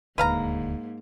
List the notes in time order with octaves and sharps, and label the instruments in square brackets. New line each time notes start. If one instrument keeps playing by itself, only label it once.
[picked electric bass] D#1 D2 D3 [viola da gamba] G#2 A#3 [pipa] B4 F5 A#5